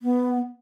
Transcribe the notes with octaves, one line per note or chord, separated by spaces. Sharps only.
B3